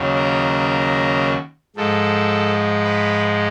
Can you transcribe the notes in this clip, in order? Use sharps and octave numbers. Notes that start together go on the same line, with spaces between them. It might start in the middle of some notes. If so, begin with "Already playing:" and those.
Already playing: D#2 C#3 F#3
A#4
G#2 F3 G#3 A4
B4